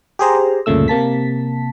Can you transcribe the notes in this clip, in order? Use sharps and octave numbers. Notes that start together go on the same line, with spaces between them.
G4 G#4 C5 A#5
D2 G2 A#2 C#3 A3 E6
C3 A#3 A5 B6